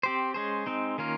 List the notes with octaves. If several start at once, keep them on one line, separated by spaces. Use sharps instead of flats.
C4 G4 C5
G#3 C#4 G#4 C5
G#3 C4 D#4
D#3 A#3 C#4 F4 A#4